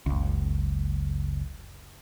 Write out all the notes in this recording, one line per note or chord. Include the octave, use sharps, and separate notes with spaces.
F#1 C#2